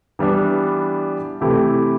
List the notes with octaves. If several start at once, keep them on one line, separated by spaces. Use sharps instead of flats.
E3 G3 B3 D4
C3 E3 A3 E4 G4